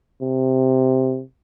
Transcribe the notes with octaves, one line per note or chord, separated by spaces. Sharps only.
C3